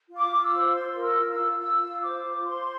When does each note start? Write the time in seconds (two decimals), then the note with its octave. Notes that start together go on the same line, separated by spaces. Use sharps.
0.09 F4
0.16 D6
0.31 F4
0.44 E6
0.53 C5
0.74 F4 C6
0.96 A#4
1.02 E6
1.17 F4
1.31 E6
1.38 F4
1.59 F4 E6
1.82 F4
2.02 C5 D6
2.24 F4
2.45 C5 C6